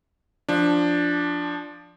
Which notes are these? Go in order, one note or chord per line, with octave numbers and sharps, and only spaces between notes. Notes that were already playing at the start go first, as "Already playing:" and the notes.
F3 D4